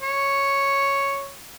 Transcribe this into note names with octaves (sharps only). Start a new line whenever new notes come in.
C#5